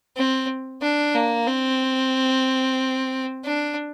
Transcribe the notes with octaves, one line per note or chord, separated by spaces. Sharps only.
C4
D4
A#3
C4
D4